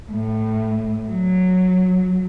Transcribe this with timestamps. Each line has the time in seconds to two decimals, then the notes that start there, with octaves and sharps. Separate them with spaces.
0.12 A2
1.07 F#3